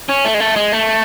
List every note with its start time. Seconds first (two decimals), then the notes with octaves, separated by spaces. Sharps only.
0.09 C#4
0.25 A3
0.34 G#3
0.40 A3
0.56 G#3
0.72 A3